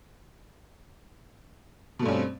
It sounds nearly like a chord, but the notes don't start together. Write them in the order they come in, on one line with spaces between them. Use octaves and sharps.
B2 A3 G2 C#4 C4